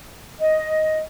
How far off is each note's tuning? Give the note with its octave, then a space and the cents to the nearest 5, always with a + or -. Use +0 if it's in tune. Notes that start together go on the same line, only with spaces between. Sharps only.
D#5 +5